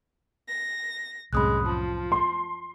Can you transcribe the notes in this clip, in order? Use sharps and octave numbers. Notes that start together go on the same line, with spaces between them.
A#6
C2 F#2 A2 C3 G#3 B5 D#6 F#6
F3 A5
C6